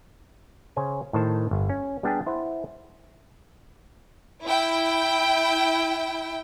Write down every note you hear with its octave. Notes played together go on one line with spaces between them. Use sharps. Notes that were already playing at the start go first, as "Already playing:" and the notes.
C#3 C#4 C5 G#5
A2 D#3 C5 A5
G1
C#4
G3 B3 D4 G4 G#4
E4 C5 F#5
E4 G5